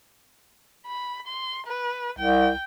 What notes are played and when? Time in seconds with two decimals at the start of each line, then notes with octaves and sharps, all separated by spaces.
0.87 B5
1.27 C6
1.67 B4
2.19 C2 G5